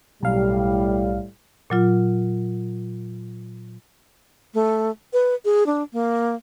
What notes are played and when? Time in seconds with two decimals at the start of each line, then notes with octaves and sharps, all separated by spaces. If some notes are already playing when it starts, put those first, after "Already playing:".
0.23 B1 A2 G3 F5
1.70 A#2 F#3 F4
4.54 A3
5.13 B4
5.45 G#4
5.66 D4
5.93 A#3